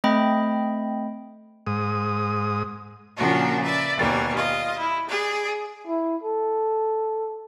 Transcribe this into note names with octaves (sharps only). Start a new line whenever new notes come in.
A3 C4 D#5 G5 B5
G#2 D#6
A#2 C#3 F3 A#3 D4 F#4
B4 D5 E5
D#2 B2 G3 G#5
F4 D#5
E4
G#4 D5
E4
A4